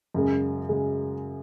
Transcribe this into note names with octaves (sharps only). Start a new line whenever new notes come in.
F#2 C#3 G#3
C#3 G#3